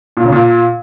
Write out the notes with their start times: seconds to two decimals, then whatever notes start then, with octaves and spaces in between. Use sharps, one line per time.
0.17 A#2
0.24 C#3
0.32 A#2